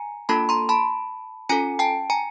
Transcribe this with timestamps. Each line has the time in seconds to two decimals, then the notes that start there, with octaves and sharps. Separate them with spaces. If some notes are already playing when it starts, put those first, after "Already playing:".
Already playing: G#5 A#5
0.29 A#3 D4 F4 A4 A5 B5
0.49 A#5 C6
0.69 A5 B5
1.49 C#4 F4 A4 G#5 A#5
1.79 G5 A5
2.10 G#5 A#5